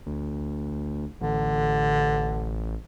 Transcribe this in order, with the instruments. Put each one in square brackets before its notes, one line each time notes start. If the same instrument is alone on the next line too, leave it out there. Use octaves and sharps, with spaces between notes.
[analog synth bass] D2
[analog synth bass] A1 [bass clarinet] D3